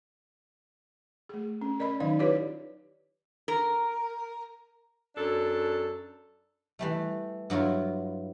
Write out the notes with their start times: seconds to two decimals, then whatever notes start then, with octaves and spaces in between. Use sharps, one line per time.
1.29 A3 G#4
1.61 C#4
1.79 A#4 D5 D#5 B5
2.00 D#3 F#3 D#4 D5 F5
2.19 E4 F4 G4 B4 C#5 D5
3.48 A#4
5.16 F#2 D4 A4
6.79 E3 G3 A3
7.50 G2 F#3 E4 F4